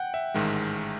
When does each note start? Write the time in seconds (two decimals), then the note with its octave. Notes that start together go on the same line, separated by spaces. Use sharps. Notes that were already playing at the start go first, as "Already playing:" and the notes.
Already playing: F#5 G5
0.14 E5
0.34 A1 G#2 D#3 G#3